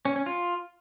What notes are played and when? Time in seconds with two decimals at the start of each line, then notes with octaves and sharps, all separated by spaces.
0.05 C#4
0.16 C#4
0.26 F4